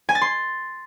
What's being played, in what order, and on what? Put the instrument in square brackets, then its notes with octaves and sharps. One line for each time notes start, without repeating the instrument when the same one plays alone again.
[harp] G#5
A6
C6